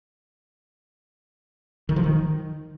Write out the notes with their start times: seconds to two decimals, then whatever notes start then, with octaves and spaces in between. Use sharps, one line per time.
1.89 D#3
1.96 F3
2.04 D#3